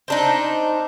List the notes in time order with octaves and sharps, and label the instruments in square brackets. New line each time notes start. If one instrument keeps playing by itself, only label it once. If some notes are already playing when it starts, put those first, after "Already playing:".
[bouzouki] C4 D4 D#4